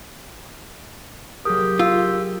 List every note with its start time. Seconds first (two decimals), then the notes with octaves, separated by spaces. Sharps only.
1.45 F#3 G4 G#4 A#4 D#6
1.79 F4 E6